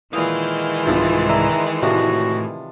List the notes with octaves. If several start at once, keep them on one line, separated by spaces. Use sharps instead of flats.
A#2 D#3 E3 G#3 F5 D#6 G6
C2 G#2 F3 E4 F4 C5 E6
D4 E4 A#5
A2 C3 F3 D4 F#4